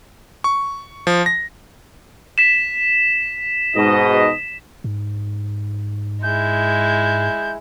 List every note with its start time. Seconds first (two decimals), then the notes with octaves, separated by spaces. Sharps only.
0.44 C#6
1.07 F3
1.26 A#6
2.38 B6 E7
3.75 G#2 B2 D#5
4.84 G#2
6.23 G#3 E4 G6